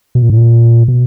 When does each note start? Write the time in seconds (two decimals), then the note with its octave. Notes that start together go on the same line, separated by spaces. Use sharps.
0.15 B2
0.23 A#2
0.30 A2
0.37 A#2
0.88 B2